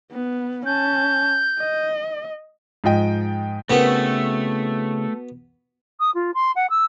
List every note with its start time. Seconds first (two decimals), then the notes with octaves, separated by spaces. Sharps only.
0.12 B3
0.66 C#4 A5 G6
1.59 D#5
2.84 G#2 F3 D#5 G5
3.70 C#3 A3 B3 C4 E4 F#4 A#4 B4
6.00 D#6
6.15 F4
6.34 C6
6.55 F#5
6.70 E6